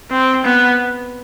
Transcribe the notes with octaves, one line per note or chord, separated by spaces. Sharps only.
C4
B3